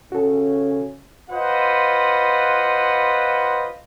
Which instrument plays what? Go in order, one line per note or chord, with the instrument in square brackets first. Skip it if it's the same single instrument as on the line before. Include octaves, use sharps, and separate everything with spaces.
[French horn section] C#3 C#4 [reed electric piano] F#4 A4
[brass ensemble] F4 B4 C5 D#5 F#5